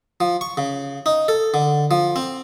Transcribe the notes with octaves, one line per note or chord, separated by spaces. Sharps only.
F3
C#6
C#3
D#4
A4
D3
F3
C4